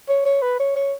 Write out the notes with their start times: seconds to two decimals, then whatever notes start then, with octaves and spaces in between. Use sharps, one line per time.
0.09 C#5
0.25 C#5
0.42 B4
0.60 C#5
0.76 C#5